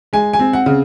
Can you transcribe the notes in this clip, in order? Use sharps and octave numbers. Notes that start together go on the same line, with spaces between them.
G#3 G#5
G#5
C4
F#5
C#3